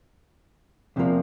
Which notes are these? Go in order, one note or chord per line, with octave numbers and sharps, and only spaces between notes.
E2 C3 F3 A#3